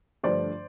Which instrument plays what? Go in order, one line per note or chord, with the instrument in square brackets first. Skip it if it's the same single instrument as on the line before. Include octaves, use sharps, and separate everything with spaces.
[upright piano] G2 D3 F3 A3 C5 D5